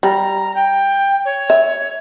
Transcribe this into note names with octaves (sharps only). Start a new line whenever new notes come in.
G3 A#5
G5
C#5
E5